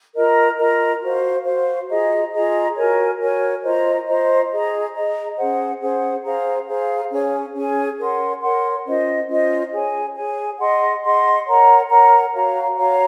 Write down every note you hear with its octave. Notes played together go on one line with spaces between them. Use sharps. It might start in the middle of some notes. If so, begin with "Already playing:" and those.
F4 A#4 D#5 A#5
F4 A#4 D#5 A#5
F#4 C5 F5
F#4 C5 F5
F4 G#4 D#5 A#5
F4 G#4 D#5 A#5
F#4 A#4 C#5 G#5
F#4 A#4 C#5 G#5
F4 C5 D#5 A#5
F4 C5 D#5 A#5
G#4 D#5 A#5
G#4 D#5 A#5
C#4 G#4 C5 F#5
C#4 G#4 C5 F#5
G#4 C5 F5 A#5
G#4 C5 F5 A#5
C#4 G#4 C#5 G#5
C#4 G#4 C#5 G#5
A#4 C#5 F#5 C6
A#4 C#5 F#5 C6
C#4 F4 C5 D#5
C#4 F4 C5 D#5
G#4 C#5 G#5
G#4 C#5 G#5
G#4 D#5 F#5 C6
G#4 D#5 F#5 C6
A#4 C#5 F#5 A#5
A#4 C#5 F#5 A#5
F#4 C#5 F5 A#5
F#4 C#5 F5 A#5